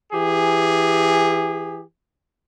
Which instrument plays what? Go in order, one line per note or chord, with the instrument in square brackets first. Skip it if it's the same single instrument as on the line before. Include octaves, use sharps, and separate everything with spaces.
[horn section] E3 G4 G#4